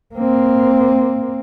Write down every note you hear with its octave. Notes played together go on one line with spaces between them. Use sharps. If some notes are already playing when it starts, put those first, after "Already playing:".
A#3 C4